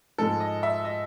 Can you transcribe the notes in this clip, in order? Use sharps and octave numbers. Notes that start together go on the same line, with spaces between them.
G#2 F3 G#3 A4
D#5
E5
D#5